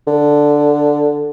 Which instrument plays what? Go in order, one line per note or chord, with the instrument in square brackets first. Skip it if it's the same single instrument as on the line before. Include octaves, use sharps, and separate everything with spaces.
[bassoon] D3